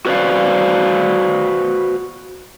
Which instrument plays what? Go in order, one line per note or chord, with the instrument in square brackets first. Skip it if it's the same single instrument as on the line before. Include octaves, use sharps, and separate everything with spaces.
[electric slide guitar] F#4 B4 C5 D5 F5